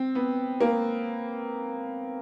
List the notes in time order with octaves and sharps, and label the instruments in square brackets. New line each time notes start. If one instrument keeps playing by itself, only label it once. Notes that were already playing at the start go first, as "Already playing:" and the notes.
Already playing: [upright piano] C4
B3
A#3